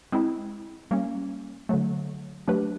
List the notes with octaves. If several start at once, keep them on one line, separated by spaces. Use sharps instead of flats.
G#3 C4 E4
G3 A#3 C#4
D3 F#3 A3
F#3 A3 D4 G4 B4